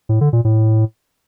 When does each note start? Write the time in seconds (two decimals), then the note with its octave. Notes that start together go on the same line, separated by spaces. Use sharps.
0.09 A2
0.21 D3
0.33 A#2
0.45 A2